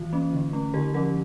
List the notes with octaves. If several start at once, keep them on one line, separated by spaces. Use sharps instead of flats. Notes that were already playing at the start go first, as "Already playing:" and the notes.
Already playing: E3 F4
A#3 C#4
D3
A3 C#4
D3 G4 A#4
F3 C#4 G4 A#4